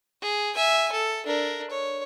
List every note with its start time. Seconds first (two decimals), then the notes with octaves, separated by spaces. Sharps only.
0.22 G#4
0.54 E5 G#5
0.92 A4
1.26 D4 A#4
1.71 C#5